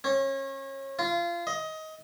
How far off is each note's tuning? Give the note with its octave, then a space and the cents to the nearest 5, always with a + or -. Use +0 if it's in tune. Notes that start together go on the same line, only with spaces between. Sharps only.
C#4 -30
F4 -25
D#5 +20